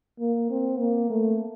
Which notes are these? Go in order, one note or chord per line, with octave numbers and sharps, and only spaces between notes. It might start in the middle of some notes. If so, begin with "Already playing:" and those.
A#3
C4
A#3
A3